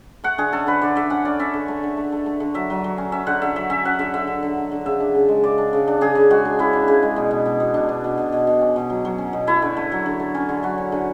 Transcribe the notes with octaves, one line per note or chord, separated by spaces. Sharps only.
A3 F#5
D3 G#4
C#4 A4
D3 B4
D3 D5
D3 E5
C#4 F#5
C#4 D5
C#4 E5
D3
A3
D3
A3
A3
A3
D3
F#3 E5
F#3
F#3
C#4
C#4 E5
D3 F#5
D3 E5
F#3 E5
C#4 E5
C#4 F#5
D3 E5
D3 E5
D3
D3
D3
D3
C#3 E5
D4
C#3
G#3
C#3 D5
D4
C#3
D4
C#3 G#4
C#3
G#3 F#4
D4
C#3 E4
D4
C#3
G#3
B2
B2
B2
B2
B2 D4
B2
B2
B2
B2
B2
C#4
B2
F#3
F#3
C#4
B2
A3 E4
D3
A3
F#3
D3
A3
C#4
D3
F#3 F#4
C#4
D3